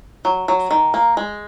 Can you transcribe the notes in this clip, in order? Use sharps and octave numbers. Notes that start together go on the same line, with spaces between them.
F#3
F#3
D#3
A#3
G#3